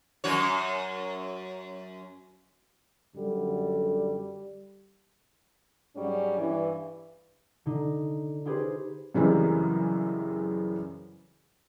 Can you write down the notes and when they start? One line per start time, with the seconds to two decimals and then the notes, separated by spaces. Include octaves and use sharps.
0.24 F#2 F#4 C#5
3.16 F#2 D3 G3
5.96 G#2 F#3 G3 C#4
6.38 G2 E3
7.66 D3 D#4
8.45 D#4 F4 G4 G#4 B4 C5
9.14 F#2 C#3 E3 G3 G#3 C4